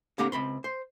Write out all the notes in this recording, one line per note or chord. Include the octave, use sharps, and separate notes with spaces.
D3 A#3 C4 G4 F#5 A#5
C#2 C4 B5 C6
C5